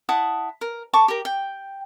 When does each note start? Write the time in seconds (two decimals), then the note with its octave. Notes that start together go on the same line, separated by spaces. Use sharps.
0.09 E4 F#5 A5 D#6
0.61 A#4
0.94 A4 A5 C#6 D6
1.08 G4 A#4
1.25 G5